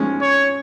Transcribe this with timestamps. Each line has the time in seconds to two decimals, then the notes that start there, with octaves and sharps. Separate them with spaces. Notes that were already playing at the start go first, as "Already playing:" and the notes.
Already playing: F3 G#3 C#4
0.21 C#5